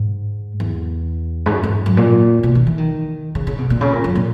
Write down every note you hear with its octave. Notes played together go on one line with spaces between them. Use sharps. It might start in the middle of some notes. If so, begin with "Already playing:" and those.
Already playing: G#2
E2
G#2
F#2
G#2
F#2
A#2
B2
D#3
E3
D#3
C#3
C#3
B2
A#2
C#3
A#2
F#2
A#2